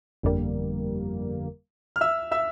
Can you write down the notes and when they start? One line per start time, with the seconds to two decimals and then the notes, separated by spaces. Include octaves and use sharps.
0.23 G1 F2 D3 G3 A#3
1.96 F6
2.01 E5 E6
2.31 E5 E6